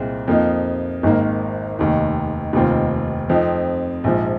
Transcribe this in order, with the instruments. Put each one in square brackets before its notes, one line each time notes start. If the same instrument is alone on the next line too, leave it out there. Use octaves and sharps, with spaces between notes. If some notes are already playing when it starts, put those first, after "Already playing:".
Already playing: [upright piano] C2 A#2 G#3 C4
F2 F3 A#3 D#4
G#1 G#2 D#3 A#3
F1 D#2 D#3
F1 D#2 D#3 C4 F4
F2 F3 C4 D#4
A#1 G#2 F3